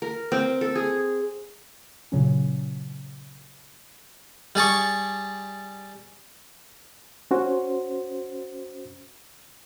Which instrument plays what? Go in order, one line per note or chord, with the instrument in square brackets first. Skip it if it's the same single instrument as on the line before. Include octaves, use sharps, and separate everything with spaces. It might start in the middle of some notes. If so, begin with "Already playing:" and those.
[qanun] A#4
C4
A4
G#4
[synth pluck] A#2 C#3 F#3 C#4
[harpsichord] G3 G#4 A5 C#6
[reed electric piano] C#4 F#4 C5